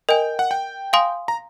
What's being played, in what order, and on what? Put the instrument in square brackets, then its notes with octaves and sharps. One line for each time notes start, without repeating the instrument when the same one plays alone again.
[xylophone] A#4 D#5 G#5 [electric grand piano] G5
[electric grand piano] F#5
G5
[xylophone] F5 G#5 C6 D#6
[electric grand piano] A#5